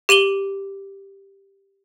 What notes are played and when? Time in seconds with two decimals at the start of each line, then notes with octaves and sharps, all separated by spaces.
0.09 G4 D#7 F#7 G7